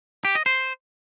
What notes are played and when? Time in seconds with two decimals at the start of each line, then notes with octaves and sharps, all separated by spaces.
0.25 G4
0.35 D#5
0.46 C5